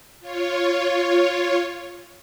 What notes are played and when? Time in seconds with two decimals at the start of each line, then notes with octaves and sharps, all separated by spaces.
0.20 F4 C#5